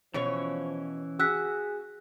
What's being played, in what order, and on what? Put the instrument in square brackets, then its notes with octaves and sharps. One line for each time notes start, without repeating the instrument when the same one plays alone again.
[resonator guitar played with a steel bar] B2 C#5 [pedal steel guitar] E3 C#4 C#6 [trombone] F3
[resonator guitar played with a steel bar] F#4 [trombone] G#4 [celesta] E6 F#6 B6